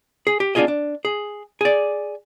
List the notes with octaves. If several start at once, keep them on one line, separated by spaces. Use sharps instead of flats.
G#4
G4
B3 D4 E4 F4 G#4 D#5
D4
G#4
G#4 D5